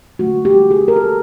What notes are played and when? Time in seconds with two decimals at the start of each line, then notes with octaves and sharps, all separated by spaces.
0.19 D3 F#3 A3 F#4
0.45 G4
0.71 G#4
0.88 A#4
0.96 A4